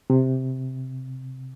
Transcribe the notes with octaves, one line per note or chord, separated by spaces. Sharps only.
C3